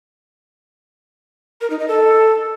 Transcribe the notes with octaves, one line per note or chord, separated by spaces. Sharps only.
A#4
D#4
D#5
A4